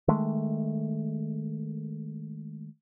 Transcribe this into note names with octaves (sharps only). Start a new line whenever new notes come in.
D#3 G#3 A3